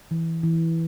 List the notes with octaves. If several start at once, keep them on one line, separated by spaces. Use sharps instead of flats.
E3
E3